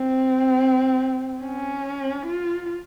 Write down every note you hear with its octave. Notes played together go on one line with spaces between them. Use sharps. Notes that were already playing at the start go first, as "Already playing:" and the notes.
Already playing: C4
C#4
F4